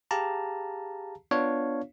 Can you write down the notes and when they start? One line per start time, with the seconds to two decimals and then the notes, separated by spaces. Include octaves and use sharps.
0.11 G4 G#4 F5 A5 A#5
1.31 B3 D4 F4 C#5 F5